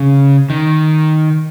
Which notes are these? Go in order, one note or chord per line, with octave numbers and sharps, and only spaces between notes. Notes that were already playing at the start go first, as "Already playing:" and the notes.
Already playing: C#3
D#3